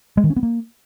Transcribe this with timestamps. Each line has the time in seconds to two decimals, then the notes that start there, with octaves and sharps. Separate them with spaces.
0.17 G#3
0.24 D#3
0.30 C#4
0.36 B3
0.43 A#3